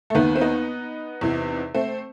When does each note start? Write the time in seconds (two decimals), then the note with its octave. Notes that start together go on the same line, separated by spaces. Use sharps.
0.10 A3
0.15 D#2 D#3 B3
0.36 C4
0.41 B3 D#4
1.21 E2 C3 E3
1.75 A3 C4